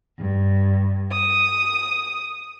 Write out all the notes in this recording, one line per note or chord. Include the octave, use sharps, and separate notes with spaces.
G2
D#6